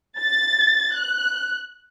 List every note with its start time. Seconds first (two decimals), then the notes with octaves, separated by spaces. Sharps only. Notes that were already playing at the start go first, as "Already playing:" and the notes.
0.19 A6
0.97 F#6